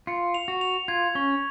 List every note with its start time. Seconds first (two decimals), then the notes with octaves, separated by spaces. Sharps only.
0.07 F4 C#7
0.34 F7
0.48 F#4
0.61 F7
0.88 F4 G#6
1.15 C#4 C#6